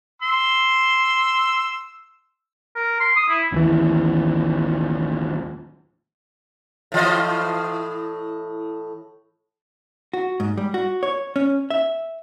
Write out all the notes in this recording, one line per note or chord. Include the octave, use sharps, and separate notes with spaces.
C6 E6
A#4
C6
D#6
E4
A1 D#2 E3
A2 E3 D#5
F#4
G#2
G3
F#4
C#5
C#4
E5